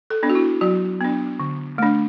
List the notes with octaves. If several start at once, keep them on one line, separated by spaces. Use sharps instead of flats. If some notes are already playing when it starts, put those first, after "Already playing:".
A4
B3 D4
F#4
E4
F#3 F#4
B3 D4
D3
A3 D4